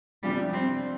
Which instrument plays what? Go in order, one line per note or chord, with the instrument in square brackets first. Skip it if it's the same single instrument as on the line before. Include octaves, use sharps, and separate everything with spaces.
[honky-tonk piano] C2 C3 F3 D4 F4 [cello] G3
[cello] C4